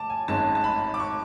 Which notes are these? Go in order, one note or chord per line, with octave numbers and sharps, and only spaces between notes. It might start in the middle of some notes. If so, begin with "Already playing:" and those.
Already playing: A5 D6
G#5
G#1 G#2 G#3 C#4 A5
A5
B5
D6
C#6